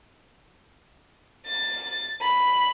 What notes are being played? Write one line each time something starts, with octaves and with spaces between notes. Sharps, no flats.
A6
B5